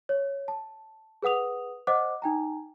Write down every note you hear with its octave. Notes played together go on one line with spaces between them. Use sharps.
C#5
A5
G#4 B4 F#5 D#6 F7
C5 D#5 F#5 D6 F#6
D#4 G5 A#5